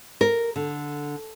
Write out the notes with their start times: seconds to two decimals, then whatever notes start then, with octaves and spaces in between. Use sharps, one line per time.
0.21 A#4
0.56 D3